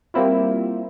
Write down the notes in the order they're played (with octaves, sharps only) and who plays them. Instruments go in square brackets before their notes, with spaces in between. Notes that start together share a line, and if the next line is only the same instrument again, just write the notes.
[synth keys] G3 A#3 C4 E4 F4